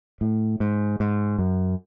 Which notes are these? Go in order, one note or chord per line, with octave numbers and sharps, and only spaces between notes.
A2
G#2
G#2
F#2